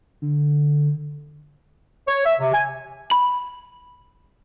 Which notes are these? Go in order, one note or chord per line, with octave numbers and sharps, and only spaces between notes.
D3
C#5
E5
C3
G#5
B5 F#7